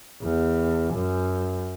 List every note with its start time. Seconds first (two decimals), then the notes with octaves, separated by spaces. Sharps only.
0.22 E2
0.93 F#2